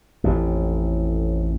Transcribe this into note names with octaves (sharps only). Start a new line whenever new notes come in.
A1 F2 A2